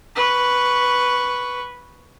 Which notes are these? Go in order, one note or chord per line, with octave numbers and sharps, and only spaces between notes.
B4 C#6